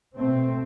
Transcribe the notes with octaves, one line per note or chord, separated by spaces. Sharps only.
B2 A3 C4